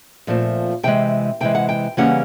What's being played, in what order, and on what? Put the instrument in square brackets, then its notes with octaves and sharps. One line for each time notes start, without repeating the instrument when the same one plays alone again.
[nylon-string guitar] A#2 F3 A3 C4
C3 E3 G#3 G5
C3 E3 G#3 G5
F#5
G5
C#3 E3 G3 A#3 C#4 F#5